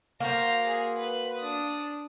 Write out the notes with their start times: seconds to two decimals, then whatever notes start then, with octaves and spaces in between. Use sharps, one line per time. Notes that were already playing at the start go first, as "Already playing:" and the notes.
0.20 A#3 F#4 C5 F5 A#5
0.66 G#4
0.97 B4
1.38 D4 D#6